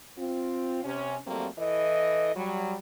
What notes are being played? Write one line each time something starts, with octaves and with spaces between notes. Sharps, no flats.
C4 F4
C3 C#4
F2 F#3 G3 A3 A#3 C4
E3 E4 A4 D#5
F#3 G3